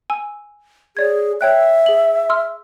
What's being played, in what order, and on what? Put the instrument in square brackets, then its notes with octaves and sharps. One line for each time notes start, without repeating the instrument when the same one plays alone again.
[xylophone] G#5 E6
[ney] G#4 [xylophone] C#5 D5 G#6
[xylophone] C#5 G5 F#6 [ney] E5
[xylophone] G#4 F#7
C6 E6 F6